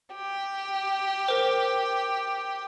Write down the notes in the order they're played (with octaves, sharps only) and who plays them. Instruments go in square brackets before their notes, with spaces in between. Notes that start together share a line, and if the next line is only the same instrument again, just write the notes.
[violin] G4
[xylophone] A#4 C5